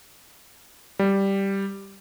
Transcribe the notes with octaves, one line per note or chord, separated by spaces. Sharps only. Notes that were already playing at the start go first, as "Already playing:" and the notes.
G3